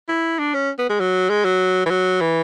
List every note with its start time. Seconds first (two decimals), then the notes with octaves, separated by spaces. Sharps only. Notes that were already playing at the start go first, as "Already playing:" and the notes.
0.09 E4
0.39 D4
0.54 C#4
0.79 B3
0.90 G#3
1.00 F#3
1.30 G#3
1.45 F#3
1.86 E3
1.91 F#3
2.21 E3